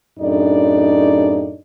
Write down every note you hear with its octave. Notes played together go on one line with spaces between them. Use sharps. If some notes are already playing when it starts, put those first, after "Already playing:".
F#2 A2 D4 D#4 G#4 D5